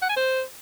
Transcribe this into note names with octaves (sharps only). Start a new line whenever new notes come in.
F#5
G#5
C5